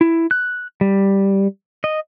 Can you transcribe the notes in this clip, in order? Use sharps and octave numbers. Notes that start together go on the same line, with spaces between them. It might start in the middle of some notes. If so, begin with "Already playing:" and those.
E4
F#6
G3
D#5